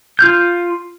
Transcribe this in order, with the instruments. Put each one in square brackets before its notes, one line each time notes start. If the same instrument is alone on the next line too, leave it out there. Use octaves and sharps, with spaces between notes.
[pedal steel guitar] F4 F6 G6